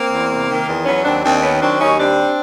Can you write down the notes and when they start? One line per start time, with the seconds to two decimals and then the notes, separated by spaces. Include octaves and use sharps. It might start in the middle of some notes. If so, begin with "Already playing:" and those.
Already playing: A#3 C4
0.11 E2
0.30 C3
0.49 D#3
0.67 E2
0.86 F#3 B3 C#4
1.05 D#2 C4 D4
1.24 D#2 C4 D4
1.42 D#3 B3 C#4
1.61 F#3 C4 D4
1.80 D#2 C#4 D#4
1.99 G3 C4 D4